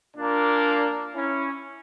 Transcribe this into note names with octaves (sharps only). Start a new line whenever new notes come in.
A#2 A#3 D4
C#4 E4